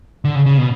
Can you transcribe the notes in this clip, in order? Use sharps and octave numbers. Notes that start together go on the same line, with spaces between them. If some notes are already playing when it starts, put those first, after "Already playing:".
D3
C#3
C#3
B2